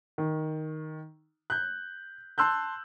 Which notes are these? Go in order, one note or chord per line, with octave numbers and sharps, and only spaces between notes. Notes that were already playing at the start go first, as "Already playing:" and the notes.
D#3
F#6 G6
A5 C6 E6 F#6 G6